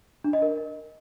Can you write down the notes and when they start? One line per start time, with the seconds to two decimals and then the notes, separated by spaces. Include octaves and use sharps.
0.24 D4
0.33 D#5
0.42 A#4